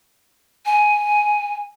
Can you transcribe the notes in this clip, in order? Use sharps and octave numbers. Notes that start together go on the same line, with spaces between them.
G#5